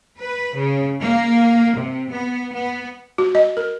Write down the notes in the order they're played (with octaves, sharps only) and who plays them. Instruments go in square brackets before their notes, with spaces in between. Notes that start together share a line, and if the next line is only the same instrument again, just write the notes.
[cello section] B4
C#3
A#3
C3
B3
B3
[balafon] F#4
D#5
A#4